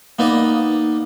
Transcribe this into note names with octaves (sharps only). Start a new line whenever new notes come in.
A#3 B3 D#4 D5 D#5